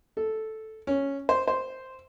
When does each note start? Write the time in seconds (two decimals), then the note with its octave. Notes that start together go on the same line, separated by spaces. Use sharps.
0.17 A4
0.87 C#4
1.29 C5
1.48 C5